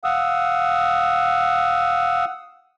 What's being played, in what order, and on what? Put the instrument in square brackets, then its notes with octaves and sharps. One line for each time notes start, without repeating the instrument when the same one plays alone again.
[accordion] F5 F#5 D#6 E6